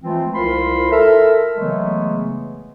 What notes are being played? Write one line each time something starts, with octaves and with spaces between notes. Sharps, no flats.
E3 F3 G#3 A3 C4 F4
C2 F4 A#4 C5 B5 C6
A4 A#4 E5
C#3 E3 F#3 G#3 A3 B3